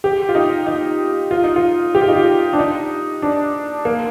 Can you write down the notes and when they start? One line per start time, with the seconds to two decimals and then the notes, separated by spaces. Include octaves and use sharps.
0.04 G4
0.29 F4
0.35 D#4
0.67 D#4
1.31 F4
1.44 D#4
1.56 F4
1.95 G4
2.01 F4
2.08 D#4
2.16 F4
2.53 D4
2.59 D#4
3.22 D4
3.85 A#3